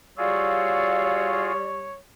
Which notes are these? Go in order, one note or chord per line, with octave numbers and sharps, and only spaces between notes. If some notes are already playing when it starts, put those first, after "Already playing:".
G3 F4 F#4 G#4 C#5 D5 F5 E6